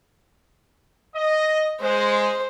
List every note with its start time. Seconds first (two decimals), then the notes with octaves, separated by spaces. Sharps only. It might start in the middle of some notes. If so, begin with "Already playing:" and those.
1.15 D#5
1.81 G#3 C5